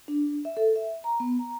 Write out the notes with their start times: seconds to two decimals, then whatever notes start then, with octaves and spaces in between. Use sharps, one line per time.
0.08 D4
0.45 E5
0.57 A4
0.76 E5
1.04 A#5
1.20 B3
1.39 A#5